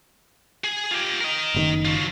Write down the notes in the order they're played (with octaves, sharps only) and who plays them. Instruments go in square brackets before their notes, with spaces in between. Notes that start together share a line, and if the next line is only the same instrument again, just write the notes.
[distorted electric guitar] G#4 G#5
F4 G4
A#4 D#5
[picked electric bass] F#1 B2 D#3
[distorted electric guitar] F#3 F4